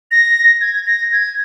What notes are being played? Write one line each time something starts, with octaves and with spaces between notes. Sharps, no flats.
A#6
G#6
A#6
G#6